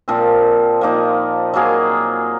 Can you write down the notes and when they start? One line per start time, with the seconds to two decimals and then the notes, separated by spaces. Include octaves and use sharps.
0.08 A#2 F3 C4
0.81 F3 A#3 D#4
1.54 F#3 A#3 F4 G#4